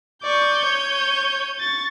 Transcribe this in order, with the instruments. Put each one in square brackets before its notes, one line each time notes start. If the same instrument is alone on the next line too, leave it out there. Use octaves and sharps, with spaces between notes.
[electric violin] D5 C#6 [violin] G6 D#7
[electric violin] C#5
C#6 A6